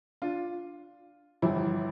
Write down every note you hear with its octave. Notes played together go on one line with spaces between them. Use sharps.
D4 F4
G1 F2 E3 G3 E4